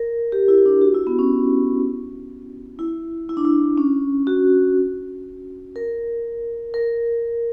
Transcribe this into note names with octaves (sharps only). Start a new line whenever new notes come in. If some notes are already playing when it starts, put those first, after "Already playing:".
Already playing: A#4
G4
E4
D4
F#4
E4
B3
C#4
E4
E4
D4
E4
C#4
F#4
A#4
A#4